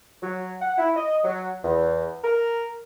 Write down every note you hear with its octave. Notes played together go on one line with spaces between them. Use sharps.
F#3
F#5
E4
D#5
F#3
E2
A#4